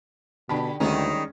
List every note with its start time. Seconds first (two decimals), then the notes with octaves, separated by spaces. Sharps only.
0.49 B2 D3 G4 A5 B5
0.80 D2 D#3 G3 G#3 C#4 D#4